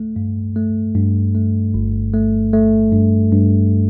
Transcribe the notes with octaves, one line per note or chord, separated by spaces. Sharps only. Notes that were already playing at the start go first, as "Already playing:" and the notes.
Already playing: A3
G2
A3
G2
A3
G1
A3
A3
G2
G2